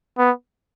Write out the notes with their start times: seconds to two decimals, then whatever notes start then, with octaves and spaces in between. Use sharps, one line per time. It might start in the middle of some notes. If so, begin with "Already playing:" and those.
0.18 B3